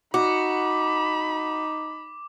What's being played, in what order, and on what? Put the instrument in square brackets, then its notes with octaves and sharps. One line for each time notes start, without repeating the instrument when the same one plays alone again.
[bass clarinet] D#4 [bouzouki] F#4 [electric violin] B5 [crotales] D6